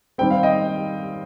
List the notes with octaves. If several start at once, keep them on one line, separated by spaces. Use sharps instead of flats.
D#3 G3 C4 G5
F5
D#5 G5